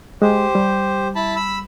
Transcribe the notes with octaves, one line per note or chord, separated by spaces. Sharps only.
G#3 G4 C5
G3
E4 A5 B5
B5 E6